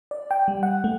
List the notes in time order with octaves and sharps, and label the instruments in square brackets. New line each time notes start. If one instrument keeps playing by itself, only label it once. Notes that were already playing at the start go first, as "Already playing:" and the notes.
[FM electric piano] D5
G5
G3
F#5
A3